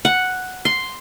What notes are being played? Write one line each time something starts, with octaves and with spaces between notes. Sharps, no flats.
F#5
C6